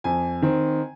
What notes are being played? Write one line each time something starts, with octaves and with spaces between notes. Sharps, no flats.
F2 G#5
D#3 C4